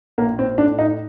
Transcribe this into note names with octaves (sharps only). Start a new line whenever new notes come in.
A#1 A#3
C4
A2 D4
D#4